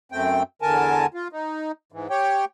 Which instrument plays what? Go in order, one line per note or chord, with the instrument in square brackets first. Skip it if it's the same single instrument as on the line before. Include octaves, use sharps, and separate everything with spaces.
[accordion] F#2 A3 C4 G5
E2 D3 A#4 G#5 A5
F4
D#4
G#2 E3
G4 C#5 G5